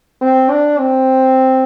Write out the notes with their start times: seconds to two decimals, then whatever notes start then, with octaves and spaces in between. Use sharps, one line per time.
0.22 C4
0.51 D4
0.79 C4